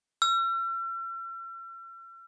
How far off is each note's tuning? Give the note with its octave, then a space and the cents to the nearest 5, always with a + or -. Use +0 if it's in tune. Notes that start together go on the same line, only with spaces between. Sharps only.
E6 +45